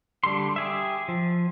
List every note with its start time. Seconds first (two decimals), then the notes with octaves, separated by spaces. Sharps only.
0.24 D3 G3 A4 C6
0.56 G4 G#4 E5
1.08 F3